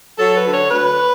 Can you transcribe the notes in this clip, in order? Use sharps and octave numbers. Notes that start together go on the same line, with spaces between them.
F#3 A4
B4
D3
C#5
D2 B4